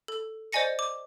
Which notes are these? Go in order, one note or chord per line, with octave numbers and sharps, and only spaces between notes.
A4
C5 D5 D#5 G#5 A#6 C#7
D6